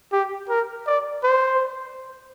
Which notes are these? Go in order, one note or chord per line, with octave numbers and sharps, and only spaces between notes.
G4
A#4
D5
C5